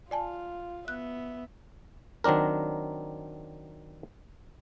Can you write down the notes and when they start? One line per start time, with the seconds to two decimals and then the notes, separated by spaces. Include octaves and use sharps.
0.11 F4 D5 G#5 A5
0.88 B3 E5 F#6
2.24 D#3 F#3 C4 D4 A#4